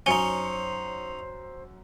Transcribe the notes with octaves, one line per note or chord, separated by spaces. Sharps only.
F#2 C#4 D#4 C5 G#5 C#7 G7